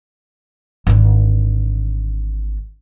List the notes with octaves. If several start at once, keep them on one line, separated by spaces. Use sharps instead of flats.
G#1 D3